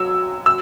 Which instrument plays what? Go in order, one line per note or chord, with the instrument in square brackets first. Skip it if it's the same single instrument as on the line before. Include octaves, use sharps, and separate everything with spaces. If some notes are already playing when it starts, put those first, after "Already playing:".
Already playing: [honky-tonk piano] F#3 [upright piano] E6
[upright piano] E6